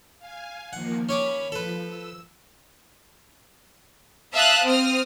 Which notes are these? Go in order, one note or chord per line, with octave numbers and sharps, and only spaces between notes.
F5 G#5
D#3 F3 A#3 F#5
C#4 C#5 B5 D6
F3 A4 B4
E6
E5 F5 A5 D#6 F6 F#6
C4 D#6 F6